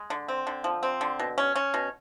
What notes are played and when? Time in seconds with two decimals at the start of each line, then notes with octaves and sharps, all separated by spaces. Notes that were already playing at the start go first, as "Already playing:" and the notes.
Already playing: G#3
0.10 D3
0.28 C4
0.47 D3
0.64 F3
0.83 C4
1.01 D3
1.19 B2
1.38 C#4
1.56 C#4
1.74 B2